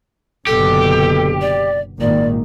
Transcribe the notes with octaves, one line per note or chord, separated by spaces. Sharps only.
F#1 B2 D3 G4 A4
D5
G#1 A#2 D#3 D5